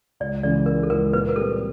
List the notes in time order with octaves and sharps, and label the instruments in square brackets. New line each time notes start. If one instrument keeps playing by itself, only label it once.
[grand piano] C#2 [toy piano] D5
[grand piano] C#3 E3 G#3 C#4 [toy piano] D5
[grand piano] C#2 [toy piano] A#4
[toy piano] A4
[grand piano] C#3 E3 G#3 C#4 [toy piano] A#4
[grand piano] A#2 [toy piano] B4
[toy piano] A#4
[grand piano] G3 C4 [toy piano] A4